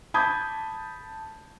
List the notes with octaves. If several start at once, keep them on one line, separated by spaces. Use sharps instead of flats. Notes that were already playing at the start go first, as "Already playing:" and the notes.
A5 B5 D6 D#6 G6 G#6